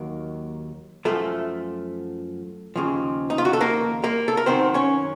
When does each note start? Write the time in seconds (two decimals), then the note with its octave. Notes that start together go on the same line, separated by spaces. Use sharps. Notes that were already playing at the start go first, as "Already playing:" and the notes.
Already playing: D#2 D#3 F#3 A#3
1.05 F#2 F3 A3 A4
2.76 D#2 C#3 F3
3.30 D#4
3.38 F4
3.45 F#4
3.53 A4
3.61 A#3 A#4
4.04 A#3 A#4
4.28 A4
4.37 A#4
4.46 F#2 D#3 F#3 C4 C5
4.74 C#4 C#5